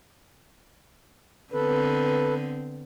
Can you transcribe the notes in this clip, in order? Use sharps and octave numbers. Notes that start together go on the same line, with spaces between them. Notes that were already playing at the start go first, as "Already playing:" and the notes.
D3 B3 C4 A4 B4